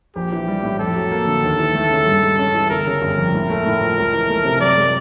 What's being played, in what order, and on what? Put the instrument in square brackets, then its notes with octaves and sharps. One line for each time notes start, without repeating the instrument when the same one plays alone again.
[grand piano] A#1 [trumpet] G4
[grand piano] E3
G3
A2
[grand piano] F2 [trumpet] A4
[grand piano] F#3
A#3
D3
D#2
E3
A3
C#3
G2
G#3
C#4
E3
[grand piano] G1 [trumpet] A#4
[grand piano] C#3
G1
F2
A2
A3
A2
F3
C#2
E3
A3
C3
[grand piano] F#2 [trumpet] D5
[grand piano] G#3